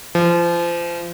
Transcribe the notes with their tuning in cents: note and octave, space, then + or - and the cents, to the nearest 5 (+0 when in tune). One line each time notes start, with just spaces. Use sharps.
F3 -30